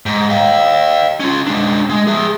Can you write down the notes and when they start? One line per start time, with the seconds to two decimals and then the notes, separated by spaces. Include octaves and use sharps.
0.06 G#2
0.30 D#5 F5
1.20 C#4 F4
1.47 G#3 D4
1.90 G#3
2.07 G#4 E5